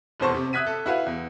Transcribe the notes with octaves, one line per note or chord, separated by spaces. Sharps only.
F1 E2 B2 C5 A5 C#6
C3
E5 D#6 F#6 G#6 B6 D#7
A4
E4 F#4 B4 F5
E2